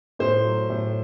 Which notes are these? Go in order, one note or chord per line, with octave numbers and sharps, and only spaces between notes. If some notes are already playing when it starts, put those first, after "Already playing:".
A2 C5
F#3
A2